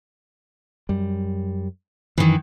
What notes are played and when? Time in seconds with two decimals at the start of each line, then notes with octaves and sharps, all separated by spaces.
0.89 F#2 G3
2.18 F#2 D#3 E3